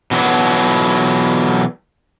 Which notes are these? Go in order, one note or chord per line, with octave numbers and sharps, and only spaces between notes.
B2 E3 F#3 D4